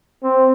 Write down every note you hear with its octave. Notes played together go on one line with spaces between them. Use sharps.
C4